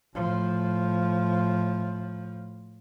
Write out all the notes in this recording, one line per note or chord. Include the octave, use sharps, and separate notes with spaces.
A2 F3